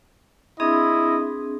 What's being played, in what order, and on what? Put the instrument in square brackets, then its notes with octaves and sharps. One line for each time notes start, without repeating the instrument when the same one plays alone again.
[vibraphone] C4 D4 G#4 [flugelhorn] E4 [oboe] D#5